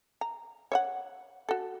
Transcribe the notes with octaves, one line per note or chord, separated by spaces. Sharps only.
A#5
C#5 E5 F#5
F#4 A4